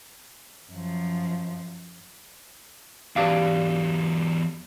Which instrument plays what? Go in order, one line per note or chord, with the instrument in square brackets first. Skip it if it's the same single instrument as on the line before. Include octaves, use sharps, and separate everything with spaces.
[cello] F#2 F3
[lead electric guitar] E2 F#3 [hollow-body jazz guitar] G4 D5 F5